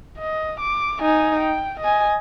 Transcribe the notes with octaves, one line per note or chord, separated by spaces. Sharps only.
D#5
D6
D#4 G#5
G5
D#5 G#5